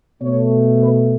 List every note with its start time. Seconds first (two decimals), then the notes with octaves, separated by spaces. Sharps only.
0.22 B2 A3 C#5
0.80 B4